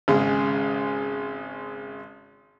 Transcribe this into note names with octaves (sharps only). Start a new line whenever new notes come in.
G#1 C#3 G#3